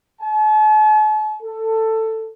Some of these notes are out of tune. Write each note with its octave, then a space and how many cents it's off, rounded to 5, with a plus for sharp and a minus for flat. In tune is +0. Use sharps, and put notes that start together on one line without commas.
A5 -45
A4 +15